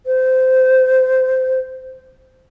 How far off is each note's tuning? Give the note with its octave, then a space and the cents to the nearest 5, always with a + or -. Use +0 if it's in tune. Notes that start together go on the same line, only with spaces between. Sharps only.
C5 -15